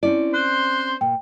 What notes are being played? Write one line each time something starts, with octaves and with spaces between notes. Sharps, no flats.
C4 C#4 E4 D5
C5 C6 F#6
A#2 G5